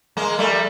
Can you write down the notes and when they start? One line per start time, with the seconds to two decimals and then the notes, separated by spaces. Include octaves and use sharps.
0.17 G#3 A#3
0.39 G3 A3